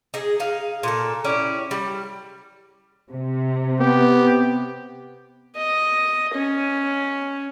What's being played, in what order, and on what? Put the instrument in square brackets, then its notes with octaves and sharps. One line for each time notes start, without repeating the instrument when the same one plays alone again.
[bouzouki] D#4 G#4
D#4 F5
A#2 A4
C#4 E4 G4 D5
G3
[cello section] C3
[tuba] B3 [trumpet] G4
[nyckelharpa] D#5
C#4